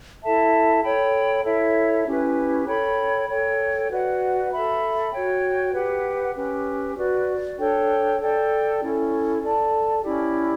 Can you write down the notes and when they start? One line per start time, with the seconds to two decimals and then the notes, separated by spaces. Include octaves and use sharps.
0.21 E4 A4 E5 A5
0.83 A4 C#5 G5 B5
1.44 E4 A4 C#5 E5
2.05 C#4 E4 G4 B4
2.67 A4 C#5 G5 B5
3.29 A4 C#5 G5
3.90 F#4 B4 D5 F#5
4.51 A4 E5 B5
5.12 F#4 C#5 G5
5.74 G4 B4 F#5
6.35 C#4 G4 B4
6.96 F#4 B4 D5
7.58 D4 A4 C#5 G5
8.20 A4 D5 G5
8.81 C#4 E4 A4
9.42 A4 D5 A5
10.03 C#4 E4 G4 D5